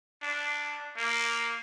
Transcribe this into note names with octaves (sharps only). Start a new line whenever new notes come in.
D4
A#3